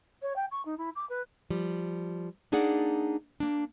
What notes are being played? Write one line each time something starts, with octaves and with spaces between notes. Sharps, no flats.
C#5
G5
C#6
D#4
E4
D6
B4
F3 G3
A#3 D4 D#4 G#4 D5 F#5
A#3 D4